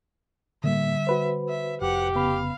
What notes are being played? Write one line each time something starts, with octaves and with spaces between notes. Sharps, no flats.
A2 D3 G3 A#3 E5
F#4 B4 C5
E5
F1 G4 F#5
C#3 B3 F5 B5